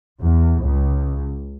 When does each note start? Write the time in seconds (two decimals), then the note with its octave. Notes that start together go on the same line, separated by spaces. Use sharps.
0.21 E2
0.63 C#2